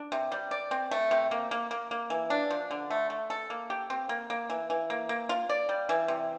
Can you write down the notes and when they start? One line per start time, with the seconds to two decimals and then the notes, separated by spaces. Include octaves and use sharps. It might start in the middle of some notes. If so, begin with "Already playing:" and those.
Already playing: D4
0.12 C3
0.32 G3
0.51 D5
0.71 C4
0.91 A3
1.11 C3
1.31 A#3
1.51 A#3
1.71 A#3
1.91 A#3
2.10 E3
2.30 D4
2.51 F3
2.71 D3
2.90 A3
3.10 A3
3.30 A4
3.50 A#3
3.70 G4
3.90 C4
4.09 A#3
4.30 A#3
4.50 E3
4.70 E3
4.90 A#3
5.09 A#3
5.29 F4
5.49 D5
5.69 G3
5.89 E3
6.08 C3